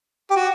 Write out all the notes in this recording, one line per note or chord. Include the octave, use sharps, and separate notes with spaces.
G4
F#4